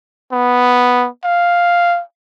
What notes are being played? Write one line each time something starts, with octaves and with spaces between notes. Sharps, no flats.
B3
F5